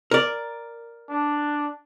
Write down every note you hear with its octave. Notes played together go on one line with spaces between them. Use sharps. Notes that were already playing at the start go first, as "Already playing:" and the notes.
A#4 D5
D4